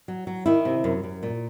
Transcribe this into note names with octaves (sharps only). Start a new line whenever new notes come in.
F#3
F#3
D#3 E4
C3
F#2
F#2
A#2